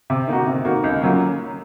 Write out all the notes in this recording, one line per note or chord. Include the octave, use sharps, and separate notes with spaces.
C3
D#3 A#3 D#4 F#4
C3
D#3 A#3 D#4 F#4
C#2
C#3 F#3 A#3 F4